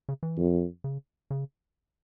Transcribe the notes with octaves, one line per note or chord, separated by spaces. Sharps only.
C#3
E3
F2
C#3
C#3